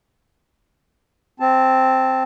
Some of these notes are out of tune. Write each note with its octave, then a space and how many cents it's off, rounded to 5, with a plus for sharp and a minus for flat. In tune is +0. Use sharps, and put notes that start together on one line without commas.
C4 +0 A5 +0